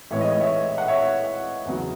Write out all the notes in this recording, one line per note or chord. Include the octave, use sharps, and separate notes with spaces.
A1 A2 E3 G#3 C#5 E5
D#5
D#5
C#5 E5
F#5
C#5 E5
E2 C#3 F#3